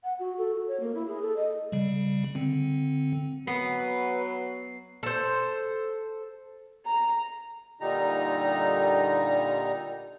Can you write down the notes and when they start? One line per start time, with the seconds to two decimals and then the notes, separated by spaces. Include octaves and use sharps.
0.04 F#5
0.19 F#4
0.38 A4
0.55 F#4
0.68 C#5
0.80 A#3
0.95 E4
1.07 G#4
1.22 A4
1.36 D#5
1.72 C#3 G3
2.35 D3 C4
3.47 F#3 B3 B4 C7
5.03 A4 C5
6.86 A#5
7.81 A#2 D3 G3 D#4 A#5